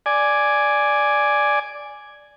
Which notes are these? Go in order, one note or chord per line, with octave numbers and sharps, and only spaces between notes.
D5 G#5